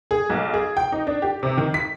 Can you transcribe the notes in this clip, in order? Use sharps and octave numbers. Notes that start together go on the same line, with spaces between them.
G#4
B1
G#4
G5
D#4
D4
G4
C3
D#3
B6